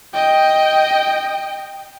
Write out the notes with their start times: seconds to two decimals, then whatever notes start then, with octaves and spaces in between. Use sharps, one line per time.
0.14 D#5 G5